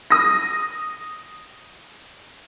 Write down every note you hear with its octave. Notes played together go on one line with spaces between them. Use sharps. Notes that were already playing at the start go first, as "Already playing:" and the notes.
D#6 A#6